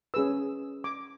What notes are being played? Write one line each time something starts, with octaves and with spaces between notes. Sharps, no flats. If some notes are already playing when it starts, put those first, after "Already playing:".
C#4 G#4 B4 E6
D6